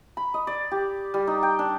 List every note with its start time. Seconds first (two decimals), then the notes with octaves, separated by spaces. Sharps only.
0.17 B5
0.34 D#5
0.47 D5
0.71 G4
1.14 G3
1.27 D#4
1.43 G5
1.59 D4